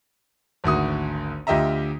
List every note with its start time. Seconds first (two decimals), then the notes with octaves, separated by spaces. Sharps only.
0.64 G#1 D2 F#4 D#6
1.47 D2 F4 G4 D#5 E5 A#5